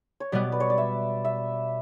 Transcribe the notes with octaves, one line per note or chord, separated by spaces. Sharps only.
C#5
B2 G3 B3 D5
B4
C#5
D5
E5
E5